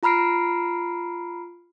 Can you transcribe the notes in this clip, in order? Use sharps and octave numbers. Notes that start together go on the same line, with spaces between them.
F4 A#5 B5 F6 C7 D7